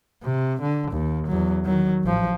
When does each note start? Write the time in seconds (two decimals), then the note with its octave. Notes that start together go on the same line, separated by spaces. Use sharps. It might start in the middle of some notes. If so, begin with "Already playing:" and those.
0.22 C3
0.62 D3
0.92 D#2
1.27 E2 F#3
1.65 D#3 F#3
2.04 A1 F3